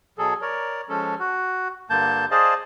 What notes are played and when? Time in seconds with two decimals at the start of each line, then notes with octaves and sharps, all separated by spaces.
0.18 B2 F#3 G#4 A4
0.42 A#4 C#5 D5
0.89 F3 G#3 C#4 A4
1.19 F#4
1.90 G2 D3 A#3 A5 G6
2.31 G#4 C5 D5 D#5 F5 A5